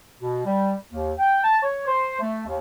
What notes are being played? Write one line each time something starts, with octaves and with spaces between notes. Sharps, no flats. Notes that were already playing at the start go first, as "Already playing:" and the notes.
B2
G3
D#2
G5
A5
C#5
C5
A3
D#2